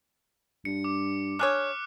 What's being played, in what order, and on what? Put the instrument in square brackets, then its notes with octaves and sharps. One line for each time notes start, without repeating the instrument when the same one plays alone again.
[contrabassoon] G2 [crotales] C#7
[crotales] D6
[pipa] D4 G#4 C#5 [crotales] D6 F6 F#6